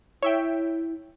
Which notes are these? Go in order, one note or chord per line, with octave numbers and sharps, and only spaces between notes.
E4 C#5 E5 G5